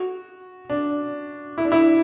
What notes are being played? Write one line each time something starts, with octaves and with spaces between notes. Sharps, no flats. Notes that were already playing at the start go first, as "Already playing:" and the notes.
Already playing: F#4
D4
E4
D4
E4